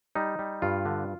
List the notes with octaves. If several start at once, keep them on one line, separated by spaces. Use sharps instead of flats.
G3 D#4
G3
G2 F4
D3